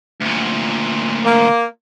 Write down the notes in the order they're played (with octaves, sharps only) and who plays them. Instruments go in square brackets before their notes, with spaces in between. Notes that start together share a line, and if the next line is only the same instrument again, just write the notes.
[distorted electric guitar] D2 A#2
[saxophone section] A#3